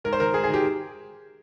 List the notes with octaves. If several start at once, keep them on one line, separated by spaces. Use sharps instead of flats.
G#2 A#4
C5
D#3 A#4
G#2 G#4
G#4
D#3 G4